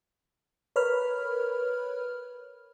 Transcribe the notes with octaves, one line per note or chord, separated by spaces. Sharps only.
A#4 B4 C#5 B5 F6